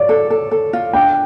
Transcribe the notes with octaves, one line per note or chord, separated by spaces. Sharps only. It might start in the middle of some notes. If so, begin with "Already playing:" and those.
Already playing: F4 C#5 D5
A4
A4
A4
F4
D4 G5